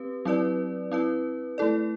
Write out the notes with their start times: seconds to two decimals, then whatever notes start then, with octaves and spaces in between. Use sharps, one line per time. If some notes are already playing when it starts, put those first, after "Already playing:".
Already playing: C4 G4 B4
0.25 F#3 C4 E4 B4 D5
0.92 C4 E4 B4
1.58 A3 E4 A4 D5